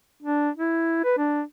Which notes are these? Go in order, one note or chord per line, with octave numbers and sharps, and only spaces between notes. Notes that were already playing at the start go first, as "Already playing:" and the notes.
D4
E4
B4
D4